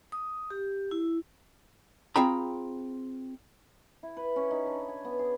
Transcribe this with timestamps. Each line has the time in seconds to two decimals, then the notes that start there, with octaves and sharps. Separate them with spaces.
0.12 D#6
0.50 G4
0.91 E4
2.16 C4 F4 G#4 G5 A#5 B5
4.03 E4
4.17 B4
4.36 C#4
4.51 D#4
4.67 D4
4.88 G#5
5.05 B3
5.19 G#4